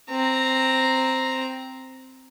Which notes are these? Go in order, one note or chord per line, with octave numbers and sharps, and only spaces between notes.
C4 A#5